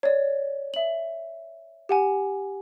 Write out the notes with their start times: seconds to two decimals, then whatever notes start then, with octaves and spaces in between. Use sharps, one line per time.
0.03 C#5 D5
0.74 E5 F#7
1.89 G4 F#5 G#5